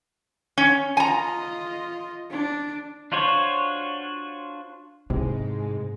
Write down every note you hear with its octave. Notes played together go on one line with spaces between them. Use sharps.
C#4
F4 D#5 G#5 A#5
D4
D4 F4 F#4 C5 C#5
G#2 C3 G#3 E4